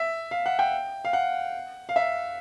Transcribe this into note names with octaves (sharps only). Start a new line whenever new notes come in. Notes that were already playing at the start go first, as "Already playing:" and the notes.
Already playing: E5
F5
F#5
G5
F5
F#5
F5
E5